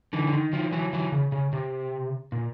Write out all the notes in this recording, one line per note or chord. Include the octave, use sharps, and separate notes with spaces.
D3 E3
D3
D#3
D#3 F3
E3 F#3
E3 F#3
C#3
C#3
C3
A#2